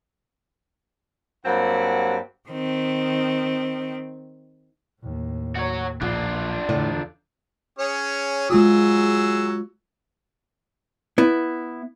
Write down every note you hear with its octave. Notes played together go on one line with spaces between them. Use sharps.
G2 F#3 A#3 C4 G4 F#5
D#3 C4
D#2 A2
F#4 C#5
A#1 D4 F4
E2 A2 D3
C#4 G#4 C#5
F#3 G#3 F4 F#4 G#4 E6
B3 E4